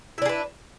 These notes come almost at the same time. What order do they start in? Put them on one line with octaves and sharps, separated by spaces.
E4 D4 G#4 B4